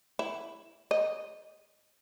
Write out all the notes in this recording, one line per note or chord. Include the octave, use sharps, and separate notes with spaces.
E4
D#5